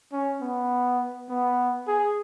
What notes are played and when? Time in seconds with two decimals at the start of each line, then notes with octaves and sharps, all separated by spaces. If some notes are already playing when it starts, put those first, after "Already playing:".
0.12 C#4
0.41 B3
1.29 B3
1.87 G#4